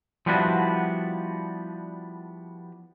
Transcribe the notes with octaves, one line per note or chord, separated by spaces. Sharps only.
F3 G3 B3 D4 E4 F#4